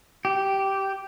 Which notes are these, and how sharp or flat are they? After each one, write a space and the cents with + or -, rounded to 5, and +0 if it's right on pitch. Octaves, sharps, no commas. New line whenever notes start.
G4 -10